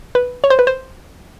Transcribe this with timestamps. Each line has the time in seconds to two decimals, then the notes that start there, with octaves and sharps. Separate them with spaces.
0.15 B4
0.44 C#5
0.50 C5
0.59 B4
0.67 C5